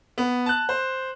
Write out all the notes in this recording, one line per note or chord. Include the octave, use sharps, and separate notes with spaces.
B3
A5 F#6
C5